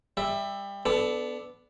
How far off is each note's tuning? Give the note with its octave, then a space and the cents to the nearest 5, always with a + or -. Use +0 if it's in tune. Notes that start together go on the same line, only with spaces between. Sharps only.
G3 +25 E5 +0
B3 +15 D4 +0 A4 -15